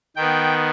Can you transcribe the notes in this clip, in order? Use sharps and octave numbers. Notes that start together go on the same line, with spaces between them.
D#3 B3 G5